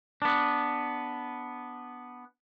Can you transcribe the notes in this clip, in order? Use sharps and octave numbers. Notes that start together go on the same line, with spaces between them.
B3 D4